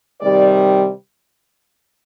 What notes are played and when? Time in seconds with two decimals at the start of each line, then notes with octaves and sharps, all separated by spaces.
0.20 C3 D#3 G3 D5